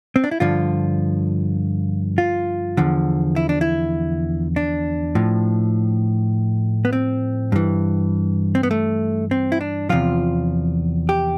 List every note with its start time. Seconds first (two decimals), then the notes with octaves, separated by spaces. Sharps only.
0.16 C4
0.24 D4
0.31 E4
0.40 G2 D3 F3 F4
2.18 F4
2.77 E2 D3 F3
3.36 E4
3.49 D4
3.61 E4
4.56 D4
5.15 A2 F3
6.85 B3
6.93 C4
7.52 G2 E3
8.55 C4
8.63 B3
8.71 A3
9.31 C4
9.52 E4
9.61 D4
9.89 E2 C3 F3 F4
11.09 G4